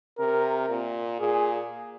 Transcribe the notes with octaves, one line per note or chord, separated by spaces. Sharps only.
C3 A#4
A#2
A#2 G#4